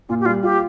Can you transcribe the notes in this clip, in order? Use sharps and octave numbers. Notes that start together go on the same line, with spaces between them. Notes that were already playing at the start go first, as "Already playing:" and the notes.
A#2 F4
G4
G3 F4
F4 G4